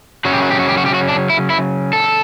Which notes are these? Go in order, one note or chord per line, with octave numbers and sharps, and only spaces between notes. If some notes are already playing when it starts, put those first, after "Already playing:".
C#3 F#3 C#4 F#4
G4
F#4
G4
F#4
G4
F#4
G4
F#4
D4
E4
E4
A4